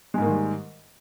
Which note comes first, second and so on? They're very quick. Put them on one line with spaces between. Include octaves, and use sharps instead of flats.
G#3 G#2 A#3 D#3 G3